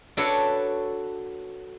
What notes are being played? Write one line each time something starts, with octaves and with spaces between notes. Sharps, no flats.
D4 F#4 A4 B4 C#5 D5